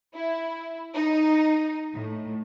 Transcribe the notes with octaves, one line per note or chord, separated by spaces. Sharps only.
E4
D#4
A2